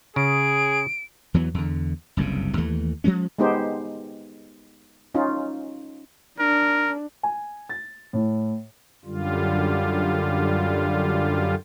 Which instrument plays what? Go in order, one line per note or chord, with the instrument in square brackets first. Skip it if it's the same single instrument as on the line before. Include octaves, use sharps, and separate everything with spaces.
[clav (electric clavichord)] C#3 [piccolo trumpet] G#4 [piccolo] D7
[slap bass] E2 E3 F#3 B3
E2 D3
F#1 C2 G2 C#3
D#2 E3 A3
F3 F#3 G#3 C#4
[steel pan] G#3 B3 D#4 G4 C5
C#4 D#4 F4
[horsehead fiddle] D4 [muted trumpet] A#4
[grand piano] G#5
A6
A2
[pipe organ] F#2 D3 G3 F4